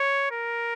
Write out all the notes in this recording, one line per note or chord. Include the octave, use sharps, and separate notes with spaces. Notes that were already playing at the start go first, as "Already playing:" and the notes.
Already playing: C#5
A#4